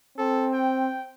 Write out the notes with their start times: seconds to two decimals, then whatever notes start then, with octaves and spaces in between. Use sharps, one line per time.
0.18 C4 A4
0.53 G5